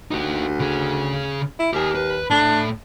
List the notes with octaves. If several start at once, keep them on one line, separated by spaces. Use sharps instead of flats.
D2 D#4 G4
C#3 G#4
E4
D#2 G4 G#5
B4
A2 D4 A4